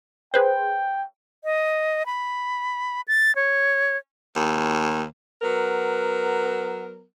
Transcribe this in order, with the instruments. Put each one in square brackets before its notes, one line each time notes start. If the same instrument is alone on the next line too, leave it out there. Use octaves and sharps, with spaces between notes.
[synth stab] G#4 B4 C5 [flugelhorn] G5
[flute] D#5
B5
A6
C#5
[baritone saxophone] D#2
[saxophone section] F#3 B3 A#4